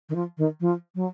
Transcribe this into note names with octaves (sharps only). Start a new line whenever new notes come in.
D#3
F3
D#3
F3
F#3